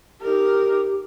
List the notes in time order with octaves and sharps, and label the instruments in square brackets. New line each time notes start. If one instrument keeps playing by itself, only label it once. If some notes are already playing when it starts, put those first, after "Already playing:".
[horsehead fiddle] D#4 A#4 [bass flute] G4